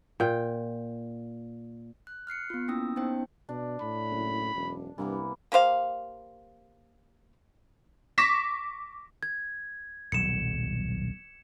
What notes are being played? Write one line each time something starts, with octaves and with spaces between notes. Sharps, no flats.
A#2 G5
F#6
F6 F#6 C7 C#7
B3 F4
A#3 C#4 E4 G5 D#6 E6
B3 C#4 D#4 C5 G5
B2 D4
A2 B5
F#1
E1 F#2
C2 G2 E3 A#3 B3
A#3 G4 C5 F5
C#6 D6 A#6 B6 E7
G#6
D#1 B1 F#3 C#7 E7